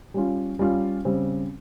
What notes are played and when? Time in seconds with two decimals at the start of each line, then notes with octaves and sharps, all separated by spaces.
0.14 G3 C#4 F4
0.59 G3 C#4 F4
1.05 C#3 G3 C4